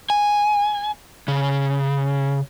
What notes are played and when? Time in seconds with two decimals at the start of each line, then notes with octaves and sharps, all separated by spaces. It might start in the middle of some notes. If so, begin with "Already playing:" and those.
0.10 G#5
1.28 C#3